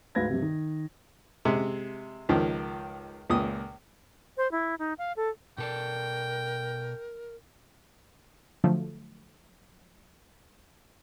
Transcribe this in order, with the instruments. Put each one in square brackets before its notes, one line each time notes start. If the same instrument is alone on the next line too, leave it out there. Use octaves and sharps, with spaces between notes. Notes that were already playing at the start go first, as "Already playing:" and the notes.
[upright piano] D2 G#2 B4 F5 G#6 A#6
G2 C3
D#3
[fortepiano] C3 G#3
C#2 D#3 F3
C#2 A#2 D#6
[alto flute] C5
E4
D#4
F5
A4
[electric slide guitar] B2 A4 D5 [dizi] A#4 [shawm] G5
[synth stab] D3 F3 F#3 A3